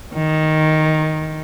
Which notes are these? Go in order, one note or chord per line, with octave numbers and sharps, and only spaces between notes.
D#3